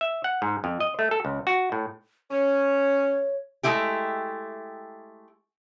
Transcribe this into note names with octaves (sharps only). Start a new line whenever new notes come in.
E5
F#5
G#2
F2
D#5
A3
A4
C#2
F#4
A2
C#4 C#5
G#3 A3 E4 G4